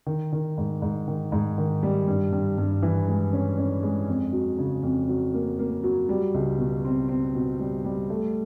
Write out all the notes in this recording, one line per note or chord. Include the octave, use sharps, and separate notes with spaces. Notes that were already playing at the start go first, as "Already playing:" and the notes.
D#3
D#3
G#2
G#2
D#3
G#2
D#3
G3
G2
G2
G2
E3
G#3
C#4
C#4
G#3
F2
F#3
C#3
F2
F#3
A#3
A#3
F#3
G3
C#2
B2
C4
C4
B2
G3
G3
A3